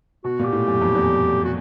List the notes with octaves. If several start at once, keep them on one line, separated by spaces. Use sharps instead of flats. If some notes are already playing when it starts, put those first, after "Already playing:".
B2 F#4
A#2
G4
A2
F#2
F2
E2
F#4